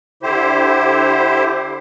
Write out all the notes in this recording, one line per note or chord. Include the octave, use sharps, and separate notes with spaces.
D3 E4 G4 C5